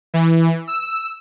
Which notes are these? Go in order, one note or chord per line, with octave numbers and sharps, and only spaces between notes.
E3
E6